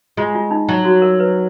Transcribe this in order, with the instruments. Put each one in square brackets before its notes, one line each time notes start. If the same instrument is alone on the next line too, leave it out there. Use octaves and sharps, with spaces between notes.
[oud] G#3 [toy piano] F4
[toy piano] F4
D#4
[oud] F#3 [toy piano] D#4
[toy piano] F#4
A#4
B4